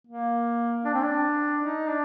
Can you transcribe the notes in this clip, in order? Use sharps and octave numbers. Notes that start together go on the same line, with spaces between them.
A#3
D4
C4
D4
D#4
D4